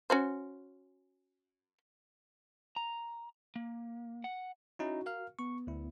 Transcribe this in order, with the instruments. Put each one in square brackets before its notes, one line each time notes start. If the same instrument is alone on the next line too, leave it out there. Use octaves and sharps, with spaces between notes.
[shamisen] C#4 F#4 C5
[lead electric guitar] A#5
A#3
F#5
[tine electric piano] C#4 D#4 E4 [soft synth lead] F#4
[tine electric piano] A#4 F5 F6
[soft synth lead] B3 [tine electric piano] C#6
[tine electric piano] D2 E4